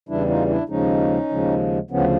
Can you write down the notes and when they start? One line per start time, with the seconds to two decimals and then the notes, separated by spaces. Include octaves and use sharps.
0.09 E2 C#3 E3 G3 D4 E4
0.29 D#4 F4
0.49 D4 E4
0.69 D#2 C#3 F3 G#3 C#4 D#4
1.30 D#2 C#3 F3 G#3
1.90 D2 C#3 F3 B3 C#4